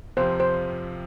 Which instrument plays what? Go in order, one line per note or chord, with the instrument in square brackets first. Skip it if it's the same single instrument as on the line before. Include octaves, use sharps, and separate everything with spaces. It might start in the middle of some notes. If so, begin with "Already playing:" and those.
[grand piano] F2 C3 F3 [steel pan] C5
[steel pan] C5